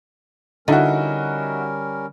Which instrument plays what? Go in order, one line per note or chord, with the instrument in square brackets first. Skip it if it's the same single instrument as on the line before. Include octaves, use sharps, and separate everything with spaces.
[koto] D3 [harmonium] G3 C#4 A#4 [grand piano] D#4 E4 F#4